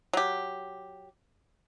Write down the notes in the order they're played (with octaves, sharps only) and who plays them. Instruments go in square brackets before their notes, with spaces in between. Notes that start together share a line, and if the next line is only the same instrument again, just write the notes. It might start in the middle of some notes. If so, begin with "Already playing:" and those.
[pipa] F#3 G4